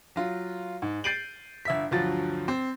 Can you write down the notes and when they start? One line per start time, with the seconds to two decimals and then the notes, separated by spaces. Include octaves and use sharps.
0.16 F#3 F4
0.82 G#2
1.04 G6 A6 C7 D7 D#7 F#7
1.65 G1 E5 B6
1.91 D2 G2 F3 F#3 A6
2.48 C4